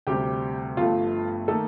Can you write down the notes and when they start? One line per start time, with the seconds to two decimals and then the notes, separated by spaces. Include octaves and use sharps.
0.07 D2 C3 G3 G4 G5
0.77 G1 G2 F3 A3 F4 F5
1.48 D#3 A3 A#3 D#4 A4